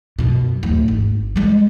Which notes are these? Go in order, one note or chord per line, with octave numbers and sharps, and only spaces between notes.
F#2 B2
D1 D#2
G#1
G3 G#3